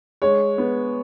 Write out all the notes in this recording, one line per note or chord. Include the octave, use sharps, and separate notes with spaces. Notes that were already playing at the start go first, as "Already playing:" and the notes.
G#3 C#5
B3